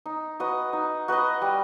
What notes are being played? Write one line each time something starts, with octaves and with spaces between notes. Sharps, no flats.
D#4
F#4 B4 D#5
D#4
F#4 B4 D#5
G3